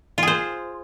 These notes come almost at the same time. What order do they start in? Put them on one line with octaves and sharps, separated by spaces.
F4 G#4 C5